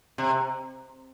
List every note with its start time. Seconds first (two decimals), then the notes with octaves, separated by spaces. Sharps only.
0.18 C3